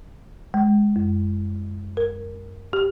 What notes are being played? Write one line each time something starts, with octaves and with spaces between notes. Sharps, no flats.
G#3
F#2
A#4
G4